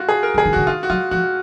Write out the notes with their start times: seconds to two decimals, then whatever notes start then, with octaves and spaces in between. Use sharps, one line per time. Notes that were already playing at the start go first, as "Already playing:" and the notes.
Already playing: F4 F#4
0.09 G#4
0.23 A#4
0.34 D#3
0.38 G#4
0.45 D#3
0.53 D3 F#4
0.67 D#3 F4
0.83 F#4
0.90 F#3 F4
1.11 F3 F#4